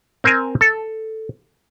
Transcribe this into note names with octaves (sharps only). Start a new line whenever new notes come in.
C4 A#4 C5 G#5
A4